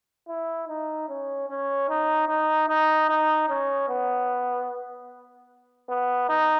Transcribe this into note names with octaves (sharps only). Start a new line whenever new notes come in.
E4
D#4
C#4
C#4
D#4
D#4
D#4
D#4
C#4
B3
B3
D#4